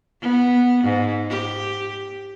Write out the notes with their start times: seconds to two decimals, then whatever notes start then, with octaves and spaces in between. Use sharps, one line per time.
0.21 B3
0.84 G#2
1.30 G4